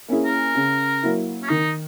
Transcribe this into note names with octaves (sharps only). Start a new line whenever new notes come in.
A#3 C#4 E4 G#4
A#4
C#3
F#3 A#3 E4
C#4
D#3 D#4